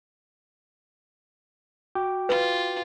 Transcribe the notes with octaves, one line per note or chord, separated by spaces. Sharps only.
F#4 G5 D6
F4 B4